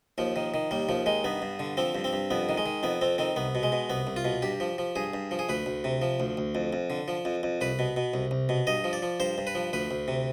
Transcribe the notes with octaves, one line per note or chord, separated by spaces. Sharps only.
D#2 F3
D#3
D#3
D#2 G3
D#2 F3
D#3 G#3
G2 B3
G2
D3
F3 C4
G2
C4
G2
F2 B3
D#3
G#3
D#3
F2 B3
F2 C4
D#3 C4
C2 B3
B2
G#3
B2
C2 B3
C2
F4
B2
G2 G4
F3
F3
G2 G#4
G2
F3
G#4
D2 B4
D2
C3
F3
D2
D2
F2
F2
D3
F3
F2
F2
C2 B4
B2
B2
C2
C2
B2
G2 D#5
F3
D5
F3
G2 C5
G2
B4
F3
D2 B4
D2
C3